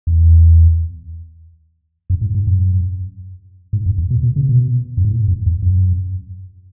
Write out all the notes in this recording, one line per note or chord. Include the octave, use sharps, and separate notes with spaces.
E2
F#2
G#2
G#2
F#2
G#2
F#2
E2
B2
B2
C#3
B2
F#2
G#2
A2
F#2
E2
F#2